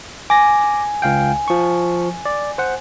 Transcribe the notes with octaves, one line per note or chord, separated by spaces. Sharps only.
G#5 D6 A#6
C#2 F5 G5
F3 C#6
D5
C5 F#5